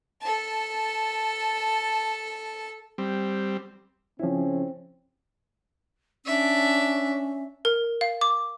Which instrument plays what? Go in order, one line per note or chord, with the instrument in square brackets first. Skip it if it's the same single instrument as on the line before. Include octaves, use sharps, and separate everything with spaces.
[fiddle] A4 A5
[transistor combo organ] G3 C4
[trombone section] C#3 C#4 [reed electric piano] F3 E4 [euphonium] C4
[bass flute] C#4 [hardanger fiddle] D4 E5
[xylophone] A#4
F5
D6